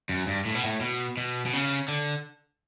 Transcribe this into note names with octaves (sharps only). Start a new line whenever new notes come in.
F#2
G2
A2
B2
A2
B2
B2
B2
C#3
D3